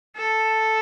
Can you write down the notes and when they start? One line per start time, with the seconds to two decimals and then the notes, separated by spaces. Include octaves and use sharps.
0.17 A4